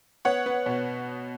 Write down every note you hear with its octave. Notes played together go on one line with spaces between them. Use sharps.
B3 C#5 F#5
B3
B2